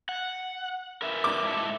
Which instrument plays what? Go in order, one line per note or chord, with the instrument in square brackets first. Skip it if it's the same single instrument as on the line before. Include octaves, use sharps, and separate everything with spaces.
[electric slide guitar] F#5
A#4 B4 E5
[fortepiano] D6
[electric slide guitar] G#2 E4 A4